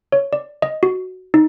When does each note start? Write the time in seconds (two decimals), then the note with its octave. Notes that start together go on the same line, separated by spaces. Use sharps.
0.12 C#5
0.33 D5
0.62 D#5
0.83 F#4
1.34 D#4